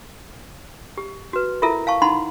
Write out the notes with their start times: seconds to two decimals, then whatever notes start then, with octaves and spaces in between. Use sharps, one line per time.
0.98 G4
1.33 F#4 B4
1.62 E4 F4 A4 A#4 E5
1.87 F5 A5 C#6
2.02 D#4 E4 F#5 A5 B5 C6